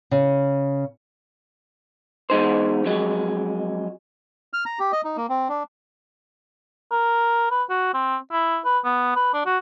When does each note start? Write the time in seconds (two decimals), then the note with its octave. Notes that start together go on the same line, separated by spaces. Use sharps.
0.11 C#3
2.30 E2 G#3 D#4 C5
2.84 F2 F#3 G#3
4.53 F6
4.66 A#5
4.79 G4
4.92 D#5
5.04 D#4
5.17 A#3
5.29 C4
5.49 D4
6.92 A#4
7.51 B4
7.69 F#4
7.94 C4
8.32 E4
8.65 B4
8.85 B3
9.16 B4
9.33 D4
9.46 F#4